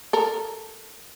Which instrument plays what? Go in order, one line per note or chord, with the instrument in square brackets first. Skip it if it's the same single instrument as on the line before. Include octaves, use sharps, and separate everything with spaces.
[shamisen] A4 A#4